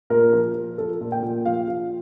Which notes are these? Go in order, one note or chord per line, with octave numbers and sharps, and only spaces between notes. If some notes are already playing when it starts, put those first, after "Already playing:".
A#2 A#4
F3
F3
F3 A4
A#2
G5
A#2
F3 F5
F3